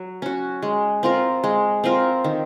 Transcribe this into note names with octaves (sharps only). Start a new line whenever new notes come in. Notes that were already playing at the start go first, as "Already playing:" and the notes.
Already playing: F#3
C#4 F#4
G#3
C4 F4 A#4
G#3
C4 F4 A#4
D#3